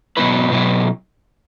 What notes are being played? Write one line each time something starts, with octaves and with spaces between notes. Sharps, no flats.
B2 F#3 B3 E4 B4
B2 F#3 B3 E4